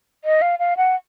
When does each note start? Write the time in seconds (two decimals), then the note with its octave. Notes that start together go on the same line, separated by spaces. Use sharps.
0.24 D#5
0.42 F5
0.59 F5
0.77 F#5